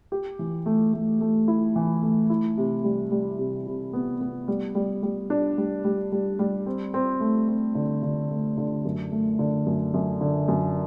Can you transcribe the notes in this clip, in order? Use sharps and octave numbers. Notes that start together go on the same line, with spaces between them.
G4
E3
A3
A3
A3
E4
E3
A3
E4
C3
G3
G3
C3
C3
B3
B3
G3
G3
G3
D4
G3
G3
G3
G3
C4
C4
A3
C4
D3
D3
A3
D3
F#2
A3
D3
F#2
F#2
D3
F#2